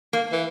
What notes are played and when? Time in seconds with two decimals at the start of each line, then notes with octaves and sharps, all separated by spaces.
0.13 A#3
0.32 E3